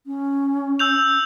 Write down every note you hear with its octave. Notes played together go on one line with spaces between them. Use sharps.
C#4
E6 G6 F7